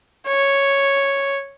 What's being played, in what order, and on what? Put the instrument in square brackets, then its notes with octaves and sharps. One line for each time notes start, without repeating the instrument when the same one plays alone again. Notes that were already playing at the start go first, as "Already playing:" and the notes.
[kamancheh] C#5